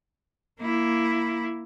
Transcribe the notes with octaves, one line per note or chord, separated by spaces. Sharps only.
A#3 E4